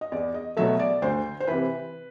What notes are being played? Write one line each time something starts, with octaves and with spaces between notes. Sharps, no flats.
D#5
E2 D5
D#5
B2 F#3 A3 E5
D5
D2 C5
C5
C3 E3 B4